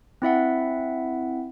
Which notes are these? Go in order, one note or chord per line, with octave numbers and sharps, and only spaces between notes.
C4 E4 E5 F#5